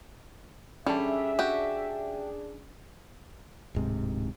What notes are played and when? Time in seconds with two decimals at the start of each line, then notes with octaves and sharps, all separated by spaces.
0.86 G3 C#4 D4 G#4 A4 E5 A5
1.39 F#4 G4
3.75 D1 G#2 C3